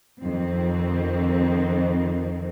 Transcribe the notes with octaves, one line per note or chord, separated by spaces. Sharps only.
F2 D#3 C4